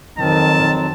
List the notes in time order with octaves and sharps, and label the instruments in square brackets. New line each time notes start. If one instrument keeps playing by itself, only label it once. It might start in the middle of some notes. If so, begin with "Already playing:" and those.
[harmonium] F2 F#3 C4 [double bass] D#3 [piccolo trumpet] A5